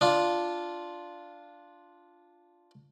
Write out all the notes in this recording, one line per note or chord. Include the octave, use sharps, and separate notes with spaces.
D4 F4